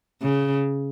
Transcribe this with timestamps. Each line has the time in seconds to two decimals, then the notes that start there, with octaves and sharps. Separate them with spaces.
0.22 C#3